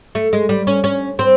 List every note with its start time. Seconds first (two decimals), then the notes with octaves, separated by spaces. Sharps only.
0.15 A3
0.33 G#3
0.49 G3
0.67 C#4
0.84 C#4
1.19 C4